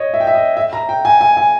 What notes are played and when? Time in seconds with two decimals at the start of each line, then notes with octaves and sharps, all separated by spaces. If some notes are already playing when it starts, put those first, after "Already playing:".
Already playing: C#5 D#5
0.14 E5
0.20 G5
0.27 E5
0.34 D#5
0.57 E5
0.73 A#5
0.89 G5
1.05 G#5
1.21 G#5
1.37 G#5